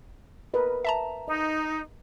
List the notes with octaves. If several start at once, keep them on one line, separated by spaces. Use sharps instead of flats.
A#4 B4 D#5
E5 A5 A#5
D#4 D#5